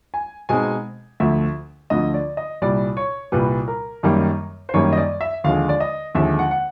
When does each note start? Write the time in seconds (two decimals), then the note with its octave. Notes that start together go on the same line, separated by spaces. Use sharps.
0.14 G#5
0.49 B2 G#3 C4 D#4 G#5
1.20 D2 D3 F3 E5
1.90 D2 D3 F3 D#5
2.14 D5
2.37 D#5
2.62 C2 A#2 G3 D5
2.97 C#5
3.32 C2 A#2 G3 B4
3.68 A#4
4.03 F#2 D#3 G3 A#3
4.69 C5
4.74 F#2 D#3 G3 A#3 C#5
4.93 D#5
4.97 D5
5.21 E5
5.44 D#2 D3 F3 G#3 F5
5.69 D5
5.80 D#5
6.15 D#2 D3 F3 G#3 E5
6.39 F#5
6.51 F#5